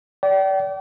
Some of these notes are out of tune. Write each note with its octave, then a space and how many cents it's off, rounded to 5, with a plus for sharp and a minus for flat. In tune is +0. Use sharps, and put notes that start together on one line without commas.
D5 -25 G5 -40